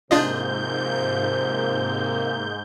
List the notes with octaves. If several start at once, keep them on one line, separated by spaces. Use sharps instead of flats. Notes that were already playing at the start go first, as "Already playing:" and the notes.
G#2 C3 F3 A#3 D4 F4 D#5 G6